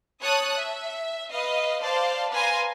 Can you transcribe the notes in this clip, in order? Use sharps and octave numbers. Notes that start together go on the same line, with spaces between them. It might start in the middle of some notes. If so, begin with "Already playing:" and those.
C#5 A5 D#6 F#6
E5
B4 D#5 F5
C5 D5 F5 A5
B4 F5 G#5 A#5 C6